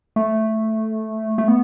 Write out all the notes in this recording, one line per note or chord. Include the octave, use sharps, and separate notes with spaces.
A3
A3
B3